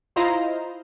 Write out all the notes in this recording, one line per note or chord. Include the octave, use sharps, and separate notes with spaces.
E4 F4 C5 D#5 F5 A#5